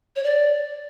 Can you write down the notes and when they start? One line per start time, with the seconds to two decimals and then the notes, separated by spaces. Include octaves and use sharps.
0.16 C#5
0.24 D5